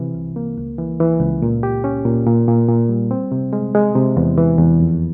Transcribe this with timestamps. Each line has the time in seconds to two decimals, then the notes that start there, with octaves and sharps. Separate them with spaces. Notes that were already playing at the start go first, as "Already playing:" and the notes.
Already playing: C3 E3
0.15 C2
0.36 A#3
0.58 C#2
0.78 E3
1.00 E3
1.20 C#2
1.42 A#2
1.63 G4
1.84 C#4
2.05 A#2
2.27 A#2
2.48 A#2
2.69 A#2
2.89 G3
3.11 C4
3.32 C3
3.53 G#3
3.75 G#3
3.95 C3
4.17 E2
4.38 E3
4.59 E2
4.80 F2